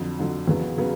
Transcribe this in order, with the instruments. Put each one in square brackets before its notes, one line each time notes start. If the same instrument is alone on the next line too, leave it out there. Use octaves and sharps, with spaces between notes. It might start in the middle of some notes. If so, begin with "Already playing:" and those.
Already playing: [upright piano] F2 D3 F#3
F2 D3 F#3
E2 C#3 F#3 B3
C#3 F#3 B3